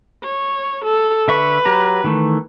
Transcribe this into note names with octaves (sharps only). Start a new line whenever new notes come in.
C#5
A4
D3 B4 E5 C#6
F#3 G4 A#5
D#3 E3 A3